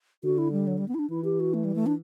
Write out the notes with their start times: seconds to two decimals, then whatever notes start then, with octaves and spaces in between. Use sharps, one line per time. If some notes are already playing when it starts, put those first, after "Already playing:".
0.24 D3 F#4
0.38 E4
0.52 G3
0.67 F#3
0.78 G3
0.88 B3
0.94 E4
0.99 D4
1.10 E3 E4
1.24 G4
1.40 F#4
1.54 A3
1.64 G3
1.75 A3
1.86 D4